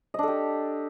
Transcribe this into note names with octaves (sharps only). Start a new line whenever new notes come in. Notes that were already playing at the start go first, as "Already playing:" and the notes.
D4 G4 A4 D#5